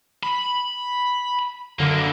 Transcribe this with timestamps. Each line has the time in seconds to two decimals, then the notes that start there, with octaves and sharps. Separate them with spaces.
0.23 B5
1.79 F#2 D3 E3 A#3